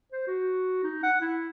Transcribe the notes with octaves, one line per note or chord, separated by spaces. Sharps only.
C5
F#4
D#4
F#5
E4